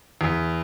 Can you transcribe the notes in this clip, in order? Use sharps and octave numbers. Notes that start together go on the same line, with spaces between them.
E2